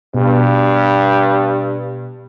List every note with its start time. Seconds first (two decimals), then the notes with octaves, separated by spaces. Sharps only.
0.14 G2 B2